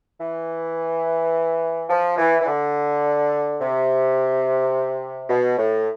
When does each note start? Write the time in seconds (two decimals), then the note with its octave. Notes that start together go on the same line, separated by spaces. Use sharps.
0.19 E3
1.90 F3
2.18 E3
2.40 E3
2.46 D3
3.59 C3
5.29 B2
5.58 A2